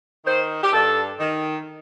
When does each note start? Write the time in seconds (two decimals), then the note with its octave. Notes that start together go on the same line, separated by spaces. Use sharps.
0.25 D#3 C5
0.63 G4
0.72 G2 A4
1.19 D#3